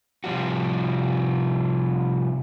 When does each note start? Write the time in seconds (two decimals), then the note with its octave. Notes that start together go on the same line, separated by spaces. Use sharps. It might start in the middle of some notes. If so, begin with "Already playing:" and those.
0.24 C3 F3 G3 F#4